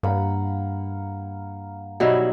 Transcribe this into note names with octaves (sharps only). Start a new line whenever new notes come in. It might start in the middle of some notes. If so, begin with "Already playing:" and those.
G2 A#3 F#5 B5
B2 F#3 G3 D#4 E4 F#4